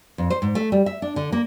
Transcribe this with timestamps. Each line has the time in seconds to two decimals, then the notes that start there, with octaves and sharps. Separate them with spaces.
0.18 F2
0.30 C5
0.42 G#2
0.55 A3
0.72 G3
0.86 E5
1.02 D4
1.16 D3
1.32 A#3